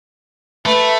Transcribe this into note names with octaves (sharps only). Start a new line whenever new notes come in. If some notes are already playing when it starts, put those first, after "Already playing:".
A3 B4